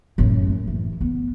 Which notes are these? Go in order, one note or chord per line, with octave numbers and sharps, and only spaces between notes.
F#2 A2
E3
B3